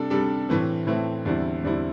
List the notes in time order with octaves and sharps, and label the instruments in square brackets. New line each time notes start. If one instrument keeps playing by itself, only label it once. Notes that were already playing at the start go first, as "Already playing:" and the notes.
Already playing: [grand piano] C3 G3 D4 A4
C3 G3 D4 A4
A2 E3 A3 C4
A2 E3 A3 C4
E2 D3 G3 C4 E4
E2 D3 G3 C4 E4